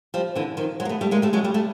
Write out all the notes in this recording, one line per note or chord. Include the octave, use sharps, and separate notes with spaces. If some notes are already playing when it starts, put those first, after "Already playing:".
F3 G3
D3 E3
D#3 F3
F#3 G#3
A#3
A3 B3
G3 A3
G#3 A#3
G3 A3
F#3 G#3
G3 A3
G3 A3